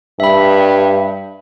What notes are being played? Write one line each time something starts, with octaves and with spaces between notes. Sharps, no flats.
G2 E5 B5